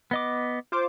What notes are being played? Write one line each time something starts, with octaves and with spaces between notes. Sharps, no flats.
B3 D#5 D6
F4 C5 D6